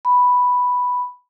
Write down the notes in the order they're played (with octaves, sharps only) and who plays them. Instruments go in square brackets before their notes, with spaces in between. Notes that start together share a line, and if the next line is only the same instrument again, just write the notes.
[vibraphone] B5